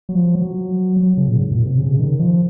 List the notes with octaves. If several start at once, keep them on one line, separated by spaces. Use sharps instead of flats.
F#3
F3
F#3
F#3
C#3
A#2
G#2
A#2
C3
C#3
D#3
F3